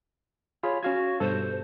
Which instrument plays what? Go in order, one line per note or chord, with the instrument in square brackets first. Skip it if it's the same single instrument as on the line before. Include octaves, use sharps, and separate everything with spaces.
[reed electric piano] F4 G#4 B5 [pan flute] C#5
[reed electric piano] C#4 F5 G#6 [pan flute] F#4
[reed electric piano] G2 B2 A4 [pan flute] C5